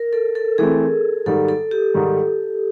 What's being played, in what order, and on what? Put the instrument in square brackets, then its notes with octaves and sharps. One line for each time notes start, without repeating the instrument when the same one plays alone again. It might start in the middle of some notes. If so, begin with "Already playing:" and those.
Already playing: [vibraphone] A#4
A4
A4
[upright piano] E3 A3 C4 [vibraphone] G#4
[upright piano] G#2 D#3 G3 [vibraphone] A4
[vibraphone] A4
G4
[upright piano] G#2 D#3 G3